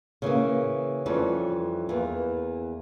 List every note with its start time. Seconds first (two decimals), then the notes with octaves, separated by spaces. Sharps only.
0.22 C#3 E3 A#3
1.06 F2 E3 G3 C#4
1.89 E2 E3 A#3